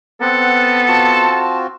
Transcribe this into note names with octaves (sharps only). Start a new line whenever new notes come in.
B3 C4 A4 F#5
C4 F4 F#4 A5